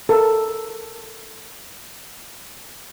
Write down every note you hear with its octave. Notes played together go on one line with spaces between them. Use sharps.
A4 A#4